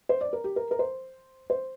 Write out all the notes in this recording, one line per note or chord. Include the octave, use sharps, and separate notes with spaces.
C5
D5
A#4
G4
A#4
A#4
C5
C5